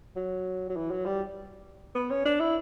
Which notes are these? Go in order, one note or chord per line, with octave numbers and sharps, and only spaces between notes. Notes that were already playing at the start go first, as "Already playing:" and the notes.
F#3
F#3
E3
F#3
G3
B3
C#4
D4
E4